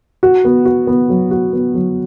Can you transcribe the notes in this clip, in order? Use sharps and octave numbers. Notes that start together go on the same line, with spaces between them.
F#4
B3
F#4
B3
F#3
F#4
B3
F#3